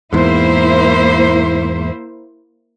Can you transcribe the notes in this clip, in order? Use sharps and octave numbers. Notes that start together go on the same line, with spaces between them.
E2 G#2 A#3 E4 C5